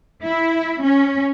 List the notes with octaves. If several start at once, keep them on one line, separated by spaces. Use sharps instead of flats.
E4
C#4